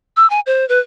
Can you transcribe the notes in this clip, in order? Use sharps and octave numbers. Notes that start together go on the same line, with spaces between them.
E6
G#5
C5
B4